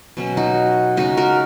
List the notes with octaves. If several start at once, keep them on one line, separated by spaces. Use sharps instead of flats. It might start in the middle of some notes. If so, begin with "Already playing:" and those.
B2 F#3 C#4
D#4 F#4
C#3 G#3 C#4 D#4 F#4
F#4 A#4